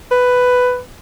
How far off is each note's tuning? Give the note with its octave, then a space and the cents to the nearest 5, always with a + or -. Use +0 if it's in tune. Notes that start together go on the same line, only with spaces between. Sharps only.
B4 +10